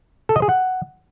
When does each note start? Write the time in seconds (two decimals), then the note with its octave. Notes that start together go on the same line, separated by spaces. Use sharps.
0.29 A4
0.36 D#5
0.42 G#4
0.49 F#5